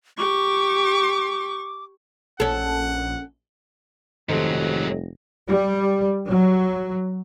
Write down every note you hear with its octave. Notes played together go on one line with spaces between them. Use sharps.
G4 C#6 D6
A#1 C#4 A4 F#5
F1 G#2 D#3 F#3 G4 A4 C5 D#5
G3
F#3